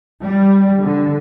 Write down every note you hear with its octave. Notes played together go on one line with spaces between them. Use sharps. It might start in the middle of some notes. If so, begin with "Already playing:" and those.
G3
D3